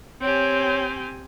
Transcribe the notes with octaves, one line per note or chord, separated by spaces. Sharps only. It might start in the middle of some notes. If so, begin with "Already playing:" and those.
C4 G4 C#5 G#5